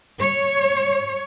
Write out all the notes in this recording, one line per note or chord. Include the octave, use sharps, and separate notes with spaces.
C#5